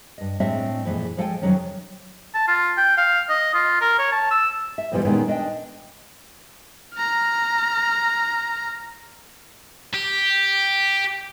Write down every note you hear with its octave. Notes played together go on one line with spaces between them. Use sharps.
G2 D#5
A2 G#3 C4 D4 D#5 E5
F2 A#2 E3 G#3
F3 G#3 A4 F5 G5 G#5
F2 C3 D#3 F#3 G3 C#4
A5
F4
G5
F5
D#5
F4
A#4
C#5
A5
E6
E5
F2 B2 E3 F3 G3
A#2 D#3 G#3 B3 C#4
D4 D#5 E5 G5
A#5 F6
G4